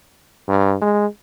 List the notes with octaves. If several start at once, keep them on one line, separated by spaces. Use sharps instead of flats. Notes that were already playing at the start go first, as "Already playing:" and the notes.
G2
G#3